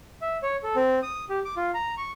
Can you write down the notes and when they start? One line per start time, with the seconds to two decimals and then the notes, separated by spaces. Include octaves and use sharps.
0.22 E5
0.43 C#5
0.63 A4
0.76 C4
1.03 D#6
1.30 G4
1.45 D6
1.57 F4
1.74 A#5
1.98 C#6